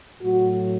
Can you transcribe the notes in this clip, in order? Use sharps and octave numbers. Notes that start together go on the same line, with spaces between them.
A2 F#3 F#4